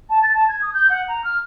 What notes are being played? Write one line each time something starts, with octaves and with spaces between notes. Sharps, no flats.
A5
A6
A5
G#6
D#6
G6
F#5
A#5
F6